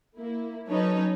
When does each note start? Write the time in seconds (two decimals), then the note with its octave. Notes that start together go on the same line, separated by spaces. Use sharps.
0.17 A#3 E4
0.68 F#3 C#4 D#4 A4 B4 C#5